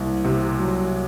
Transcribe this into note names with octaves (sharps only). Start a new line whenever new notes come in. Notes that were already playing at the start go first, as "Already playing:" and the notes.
Already playing: C2 A#3
C3
F#3